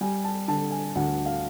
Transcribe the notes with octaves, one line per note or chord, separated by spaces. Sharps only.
G3 G#5
A5
D3 A5
G#5
D2 F#5
F5